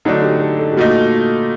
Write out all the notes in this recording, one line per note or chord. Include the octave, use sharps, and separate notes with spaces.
D3 F#3 A3 D4 D#4
G4
A4
A4
G4
A#2 A3 D#4 F#4